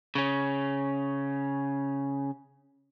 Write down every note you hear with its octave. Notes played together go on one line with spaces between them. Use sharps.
C#3 C#4